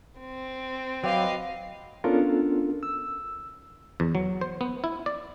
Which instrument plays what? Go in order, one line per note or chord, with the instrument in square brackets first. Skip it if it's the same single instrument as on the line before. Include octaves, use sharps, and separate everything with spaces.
[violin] C4
[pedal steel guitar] F#3 [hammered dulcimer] G4 [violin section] B4 D#5 F5
[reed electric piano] B3 C#4 D4 F4 A4 A#4
E6
[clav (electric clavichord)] E2
F#3
C5
B3
E4
D5